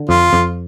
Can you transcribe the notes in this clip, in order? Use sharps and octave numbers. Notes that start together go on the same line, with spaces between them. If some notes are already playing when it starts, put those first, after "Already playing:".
Already playing: D3
F2 F4
F2